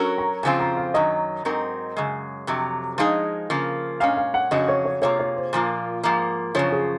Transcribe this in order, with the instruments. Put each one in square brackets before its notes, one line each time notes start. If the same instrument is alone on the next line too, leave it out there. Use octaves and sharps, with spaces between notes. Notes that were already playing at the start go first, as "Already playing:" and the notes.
Already playing: [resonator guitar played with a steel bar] F#3 C#4 F#4 A#4
[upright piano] A#5
[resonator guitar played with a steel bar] F2 C#3 F3 C4 F4 [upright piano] G#5
[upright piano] A#5
F5
[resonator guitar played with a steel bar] F#2 D#3 F#3 [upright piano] D#5
[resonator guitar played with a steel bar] G#2 F#3 C4 D#4 A#4
F#2 C#3 G#3
F2 C3 F#3
[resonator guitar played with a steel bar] F3 G#3 D#4 G#4 [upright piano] F5
[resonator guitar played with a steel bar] C#3 F3 A#3
[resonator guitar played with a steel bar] A#2 G#3 C#4 [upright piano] F5
[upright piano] F5
F#5
[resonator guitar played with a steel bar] F2 C#3 F#3 C#4 F#4 [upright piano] D#5
[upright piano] C#5
C#5
[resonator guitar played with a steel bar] C3 D#3 A#3 F4 G#4 [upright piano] C#5
[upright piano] C#5
C5
[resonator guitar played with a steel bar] A#2 F3 A#3 F4
G#2 F3 A#3
[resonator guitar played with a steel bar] F#2 C#3 F3 [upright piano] C#5
[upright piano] G#4